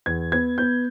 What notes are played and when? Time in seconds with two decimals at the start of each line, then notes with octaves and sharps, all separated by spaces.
0.06 E2 G#6
0.32 B3 G#6
0.58 B3 G6